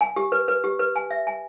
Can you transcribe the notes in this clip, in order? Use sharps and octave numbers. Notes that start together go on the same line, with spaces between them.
G#5
G4
B4
B4
G4
B4
G#5
E5
G#5